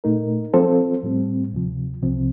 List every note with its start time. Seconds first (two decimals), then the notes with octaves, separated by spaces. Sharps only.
0.04 A#2 A3 D#4 A#4
0.54 F3 C4 F4 A4 C5
1.04 A2 G3 C4
1.53 D2 C3 F3
2.03 C2 C3 F3 C4